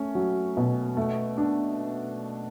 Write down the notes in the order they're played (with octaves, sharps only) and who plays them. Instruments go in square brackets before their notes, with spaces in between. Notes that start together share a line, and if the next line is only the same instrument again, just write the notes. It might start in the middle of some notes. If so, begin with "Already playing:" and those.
Already playing: [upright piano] A3 C#4
F#3
B2
A3
D4